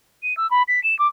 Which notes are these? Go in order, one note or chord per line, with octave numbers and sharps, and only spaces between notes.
D#7
E6
B5
B6
E7
D6